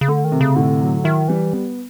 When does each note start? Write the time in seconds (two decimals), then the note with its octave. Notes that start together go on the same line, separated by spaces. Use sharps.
0.01 C#3
0.08 D3 A3
0.25 D#3
0.32 C3
0.41 C#3
0.56 A2 D3
0.81 F#3
1.04 D#3 E4
1.28 E3 G3
1.53 B3